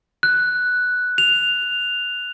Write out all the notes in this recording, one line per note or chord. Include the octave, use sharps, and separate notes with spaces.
F#6
F7